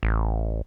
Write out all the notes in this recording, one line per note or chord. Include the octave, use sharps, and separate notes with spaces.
A1